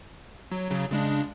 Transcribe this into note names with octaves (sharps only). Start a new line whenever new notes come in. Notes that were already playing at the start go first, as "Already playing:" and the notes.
F#3
C#3 F#3
C#3 G#3 D4